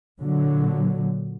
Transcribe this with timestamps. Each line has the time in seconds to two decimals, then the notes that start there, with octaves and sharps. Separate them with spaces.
0.19 A#2 D3 F#3